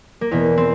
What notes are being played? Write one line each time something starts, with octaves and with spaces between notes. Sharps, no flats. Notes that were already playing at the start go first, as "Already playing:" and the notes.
A#3
E2 B2 B3
C4